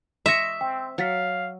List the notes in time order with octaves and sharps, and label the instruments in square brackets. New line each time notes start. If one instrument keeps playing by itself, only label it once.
[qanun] D#5 C#6 [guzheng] E5 [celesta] C6 A#6
[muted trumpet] C4 [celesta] G5
[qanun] F#3 [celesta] C#5 A6 B6 [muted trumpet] F5